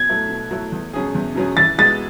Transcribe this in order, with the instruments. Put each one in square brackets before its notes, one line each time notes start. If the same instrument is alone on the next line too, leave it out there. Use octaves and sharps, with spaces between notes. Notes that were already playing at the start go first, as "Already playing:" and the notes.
Already playing: [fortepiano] B2 [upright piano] G#6
[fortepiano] F#3 A3 E4
B2
F#3 A3 E4
E2
B2 F#3 C#4 G#4
E2
B2 F#3 C#4 G#4
[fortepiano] E3 [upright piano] A6
[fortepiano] G#3 B3 F#4 [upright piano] A6